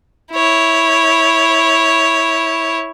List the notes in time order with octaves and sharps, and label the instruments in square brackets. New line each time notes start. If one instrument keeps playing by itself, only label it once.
[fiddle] E4 C#5